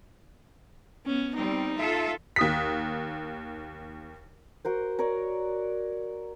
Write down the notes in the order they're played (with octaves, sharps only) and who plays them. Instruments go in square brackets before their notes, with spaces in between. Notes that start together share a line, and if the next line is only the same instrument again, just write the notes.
[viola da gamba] B3 C#4
[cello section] G3 C4 [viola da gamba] D#4
[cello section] F4 A4 E5
[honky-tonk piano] D#2 D#6 B6
[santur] F#4 A#4 C5
A#4 C#5 D5